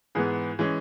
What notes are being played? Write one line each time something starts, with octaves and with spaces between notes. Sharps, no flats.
G#2 E3 B3 G#4
E3 G#3 C#4